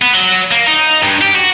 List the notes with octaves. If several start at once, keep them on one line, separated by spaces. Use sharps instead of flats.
B3
F#3
A#3
D#4
G2
G4
F#4